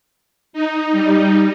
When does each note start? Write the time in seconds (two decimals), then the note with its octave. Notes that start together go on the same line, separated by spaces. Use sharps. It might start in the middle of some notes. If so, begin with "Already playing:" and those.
0.53 D#4
0.91 G3 D#4